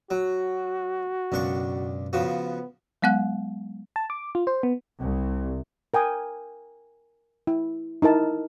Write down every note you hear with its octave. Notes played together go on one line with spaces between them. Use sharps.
F#3 F#4
C#2 F#2 B2 D4 C#6
C#3 F3 B3 F#4
F#3 G#3 B3 F#5 F#6
A5
D6
F4
C5
B3
C2
A#4 G5 G#5 D#6
E4
D#4 E4 A#4 A5